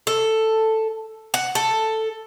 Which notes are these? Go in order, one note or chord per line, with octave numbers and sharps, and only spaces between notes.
A4
F#5
A4